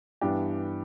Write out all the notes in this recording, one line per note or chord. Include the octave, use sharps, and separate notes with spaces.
G2 E3 B3 D4 G4